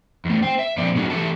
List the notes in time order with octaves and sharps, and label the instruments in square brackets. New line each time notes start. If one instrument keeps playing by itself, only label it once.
[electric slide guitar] E2 A3
C5 G5
E5
A#2 F3 C4 D5
F#3 A3 C#4 D#4 F#4
E3 A3 G4 A4 E5 A5